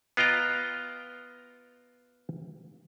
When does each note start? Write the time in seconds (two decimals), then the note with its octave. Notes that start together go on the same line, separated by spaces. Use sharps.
0.17 B3 F4 D#5 G5 A#5